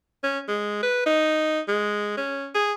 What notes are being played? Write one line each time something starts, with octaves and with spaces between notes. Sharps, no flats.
C#4
G#3
B4
D#4
G#3
C#4
G#4